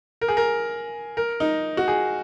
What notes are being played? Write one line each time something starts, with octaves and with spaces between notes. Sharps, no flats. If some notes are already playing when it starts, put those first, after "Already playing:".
A#4
G#4
A#4
A#4
D#4
F#4
G#4